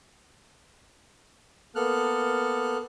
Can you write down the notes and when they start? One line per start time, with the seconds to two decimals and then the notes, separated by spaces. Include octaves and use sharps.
1.75 A#3 B3 A4 F6 F#6